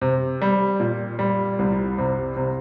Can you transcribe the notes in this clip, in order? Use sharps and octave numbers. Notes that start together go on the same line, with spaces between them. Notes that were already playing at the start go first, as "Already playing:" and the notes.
C3
G3
A#2
G3
C2
C3
C3